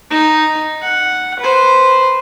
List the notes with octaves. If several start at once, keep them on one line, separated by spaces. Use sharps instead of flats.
D#4
F#5
B4 C5